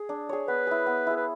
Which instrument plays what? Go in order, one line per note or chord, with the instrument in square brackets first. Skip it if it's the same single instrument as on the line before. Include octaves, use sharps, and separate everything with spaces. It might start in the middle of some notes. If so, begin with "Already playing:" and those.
Already playing: [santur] G#4
D4
G#4 C#5
[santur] B3 [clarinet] B4
[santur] E4 G#4
B3
E4 G#4
[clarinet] B4